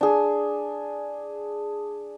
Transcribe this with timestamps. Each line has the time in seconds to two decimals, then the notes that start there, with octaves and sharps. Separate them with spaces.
0.01 D4 G#4